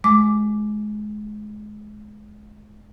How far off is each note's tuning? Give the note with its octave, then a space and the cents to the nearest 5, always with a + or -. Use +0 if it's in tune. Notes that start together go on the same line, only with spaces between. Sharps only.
G#3 +25 D6 +0